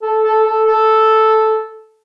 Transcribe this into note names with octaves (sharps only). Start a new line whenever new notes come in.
A4
A4
A4
A4